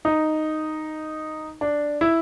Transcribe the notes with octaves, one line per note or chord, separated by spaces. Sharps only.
D#4
D4
E4